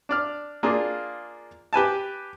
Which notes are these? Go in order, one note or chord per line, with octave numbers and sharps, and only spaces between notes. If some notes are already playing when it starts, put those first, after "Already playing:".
D4 D5 F6
A#3 D4 F4 G#4
G4 B4 G#5 A5